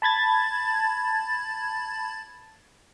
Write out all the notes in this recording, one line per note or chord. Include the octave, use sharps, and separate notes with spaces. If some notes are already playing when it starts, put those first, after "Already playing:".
A5 B5 G#6 A6